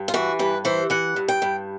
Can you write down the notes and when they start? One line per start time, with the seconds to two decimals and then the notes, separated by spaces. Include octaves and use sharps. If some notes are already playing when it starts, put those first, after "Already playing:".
Already playing: G2
0.08 F4
0.14 E3 F#4
0.39 G2 B4
0.65 E3 C5
0.90 E3 F#5
1.16 G2
1.28 G5
1.42 G2